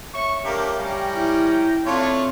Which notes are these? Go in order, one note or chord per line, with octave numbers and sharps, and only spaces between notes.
C#5 E5 C#6
A3 A#3 D4 G4 A#4
G3 C#4 G4 G5 A#5
E4
A3 C4 D4 F4 C#5